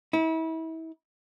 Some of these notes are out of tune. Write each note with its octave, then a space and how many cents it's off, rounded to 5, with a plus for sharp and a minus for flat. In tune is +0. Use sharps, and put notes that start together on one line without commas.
E4 -35